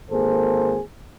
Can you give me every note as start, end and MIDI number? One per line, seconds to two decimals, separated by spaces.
0.11 0.79 32
0.11 0.79 58
0.11 0.79 68
0.11 0.79 69
0.11 0.79 72